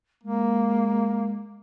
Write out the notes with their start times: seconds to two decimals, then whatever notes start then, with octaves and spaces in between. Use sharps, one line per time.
0.24 G#3 A#3